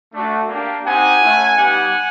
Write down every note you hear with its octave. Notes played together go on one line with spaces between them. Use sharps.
A3 D4 F#4
A#3 D4 G4
C4 D#4 G4 F#5 G#5
A3 C#4 E4
G3 B3 D#4 G4 F#5 G#5